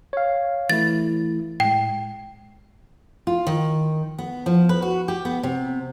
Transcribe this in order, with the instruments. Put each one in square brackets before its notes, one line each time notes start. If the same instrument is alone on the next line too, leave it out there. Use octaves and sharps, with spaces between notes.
[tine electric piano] C#5 F5
[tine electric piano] E3 A3 E4 [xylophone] A6
[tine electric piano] A2 G#3 [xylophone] G5
[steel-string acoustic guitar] F4
D#3
B3
F3
B4
F#4
G4
B3
C3